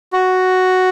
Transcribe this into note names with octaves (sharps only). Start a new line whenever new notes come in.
F#4